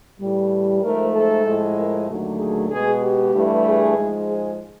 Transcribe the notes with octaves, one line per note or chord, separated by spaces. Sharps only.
A2 E3 G3
G#2 F3 A3 A#4
A4
A2 F3 G#3
A#4
D#2 D3 F#3 A3
G#4
B2 G#3 G#4
G4
G2 E3 A3
G#4
G#2 F3 G#3
G#4